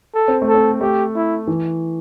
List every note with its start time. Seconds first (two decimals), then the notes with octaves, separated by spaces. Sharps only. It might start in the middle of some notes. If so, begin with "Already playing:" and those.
0.14 A4
0.28 C4
0.42 A3
0.48 A4
0.55 C4
0.81 A3 G4
1.15 E4
1.47 E3